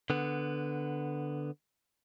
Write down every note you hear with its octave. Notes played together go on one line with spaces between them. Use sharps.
D3 B3